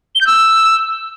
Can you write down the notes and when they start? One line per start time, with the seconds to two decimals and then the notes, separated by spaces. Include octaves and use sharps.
0.15 G7
0.21 G6
0.27 E6